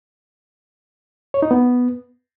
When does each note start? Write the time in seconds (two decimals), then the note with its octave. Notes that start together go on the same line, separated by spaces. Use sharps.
1.34 C#5
1.42 D#4
1.51 B3